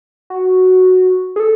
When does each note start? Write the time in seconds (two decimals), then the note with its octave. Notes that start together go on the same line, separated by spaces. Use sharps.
0.30 F#4
1.36 G#4
1.40 A4